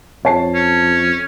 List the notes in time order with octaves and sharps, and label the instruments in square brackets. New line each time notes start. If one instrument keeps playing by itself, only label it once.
[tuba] F2 [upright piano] C#5 A5 C7
[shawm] C#4